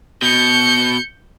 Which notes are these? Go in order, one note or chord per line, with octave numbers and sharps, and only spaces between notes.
B2 G6 C#7